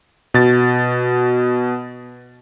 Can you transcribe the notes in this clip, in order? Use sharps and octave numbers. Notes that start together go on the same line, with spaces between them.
B2 A6